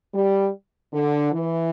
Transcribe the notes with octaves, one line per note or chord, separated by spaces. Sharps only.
G3
D3
E3